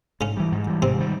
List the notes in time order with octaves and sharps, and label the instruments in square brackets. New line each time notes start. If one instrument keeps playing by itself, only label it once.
[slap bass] G#2 [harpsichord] C#3 C#4
[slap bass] E3 G3
G#2
E3 G3
[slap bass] G#2 [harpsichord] C3 C4
[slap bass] D#3 G3